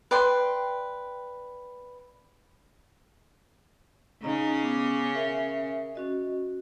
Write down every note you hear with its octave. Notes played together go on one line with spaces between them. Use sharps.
B4 D5 G5 C6
C#3 C#4 D#4 D#5 A#5
B3 D6
A#4 E5
C#4 F#4 D#5